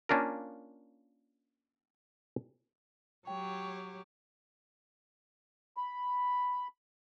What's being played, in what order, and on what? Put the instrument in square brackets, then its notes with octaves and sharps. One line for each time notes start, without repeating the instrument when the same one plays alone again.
[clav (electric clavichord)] A#3 C#4 D4 F4 A#4
[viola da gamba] F#3 G4 [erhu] C#5 [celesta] G5
[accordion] B5